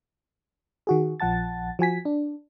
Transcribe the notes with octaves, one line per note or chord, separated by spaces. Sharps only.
D#3 F#4 G#4
A#1 F3 F#5 A5 A6
F3 F#4 G#5 B6
D4